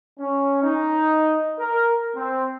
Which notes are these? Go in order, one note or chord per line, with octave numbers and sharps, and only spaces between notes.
C#4
D#4
A#4
C4